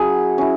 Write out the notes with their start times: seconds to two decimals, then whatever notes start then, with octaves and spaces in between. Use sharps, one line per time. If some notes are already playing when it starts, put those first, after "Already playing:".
Already playing: F#3 C#4 E4 G#4 F#5
0.38 C#4 E4